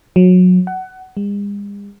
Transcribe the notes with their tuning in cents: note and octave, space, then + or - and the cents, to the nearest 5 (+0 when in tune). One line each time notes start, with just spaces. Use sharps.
F#3 -25
F#5 +20
G#3 -45